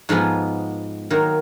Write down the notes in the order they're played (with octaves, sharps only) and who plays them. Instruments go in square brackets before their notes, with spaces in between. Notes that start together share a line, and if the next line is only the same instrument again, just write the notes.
[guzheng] G#2 F3 G#3 B3
D#3 F#3 A#3